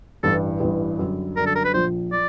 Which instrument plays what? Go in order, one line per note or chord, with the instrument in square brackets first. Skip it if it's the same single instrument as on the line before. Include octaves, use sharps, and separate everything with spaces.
[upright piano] A1 G2 E3 [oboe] A4
[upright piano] A1 G2 E3
F#2 D3 G3
[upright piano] F#2 D3 G3 [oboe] A#4
[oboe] A4
A#4
B4
[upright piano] A#1 A#2 F3 [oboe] C5
[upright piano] F3 [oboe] D5